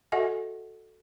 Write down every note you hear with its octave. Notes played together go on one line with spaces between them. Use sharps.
F#4 A4 D#5 E5 F#5 G#5